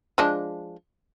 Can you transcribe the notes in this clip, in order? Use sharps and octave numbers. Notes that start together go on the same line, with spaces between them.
F3 G#3 D4